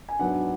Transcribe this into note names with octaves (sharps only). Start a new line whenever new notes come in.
G#5
G#2 F#3 B3 D4 F#5